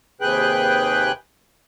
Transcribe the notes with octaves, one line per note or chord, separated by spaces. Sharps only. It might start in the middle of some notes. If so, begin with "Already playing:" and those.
D#2 C3 G#4 B4 G5 F#6